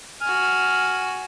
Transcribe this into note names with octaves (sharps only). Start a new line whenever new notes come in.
F#4 G#5 F6